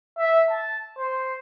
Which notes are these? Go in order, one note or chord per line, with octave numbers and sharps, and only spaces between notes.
E5
A5
C5